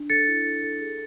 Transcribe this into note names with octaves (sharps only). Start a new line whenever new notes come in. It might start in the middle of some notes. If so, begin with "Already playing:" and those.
Already playing: D4
A4 A6 C#7
E4
A4
A4
G#4